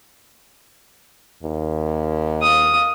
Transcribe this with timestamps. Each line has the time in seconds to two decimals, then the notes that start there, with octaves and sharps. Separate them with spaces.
1.43 D#2
2.42 F5 D#6